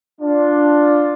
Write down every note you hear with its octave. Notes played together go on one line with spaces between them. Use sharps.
D4 F4